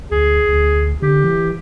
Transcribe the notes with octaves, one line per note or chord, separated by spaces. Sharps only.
D2 G#4
D2
D3 G4
E3